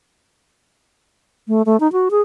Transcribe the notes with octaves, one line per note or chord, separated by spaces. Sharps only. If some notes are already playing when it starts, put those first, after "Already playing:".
A3
A3
D#4
F#4
G#4